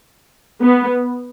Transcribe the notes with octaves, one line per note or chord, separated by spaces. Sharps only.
B3